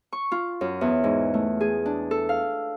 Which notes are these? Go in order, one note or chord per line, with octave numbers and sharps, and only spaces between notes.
C#6
F4
F#2
E2
G#2
A3
G#4
D4
A4
F5